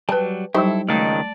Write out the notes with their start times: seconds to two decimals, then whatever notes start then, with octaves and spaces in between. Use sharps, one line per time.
0.09 F#3 G3 B4 G5 A5
0.54 F#3 G3 D#4 E4 G4 A4 C5
0.89 C#2 D#3 A3 D5 A5